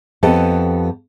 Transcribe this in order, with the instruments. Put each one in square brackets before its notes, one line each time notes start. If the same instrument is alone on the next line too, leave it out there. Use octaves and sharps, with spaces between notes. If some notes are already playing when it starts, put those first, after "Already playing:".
[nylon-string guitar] F2 B3 G4 A4 D#5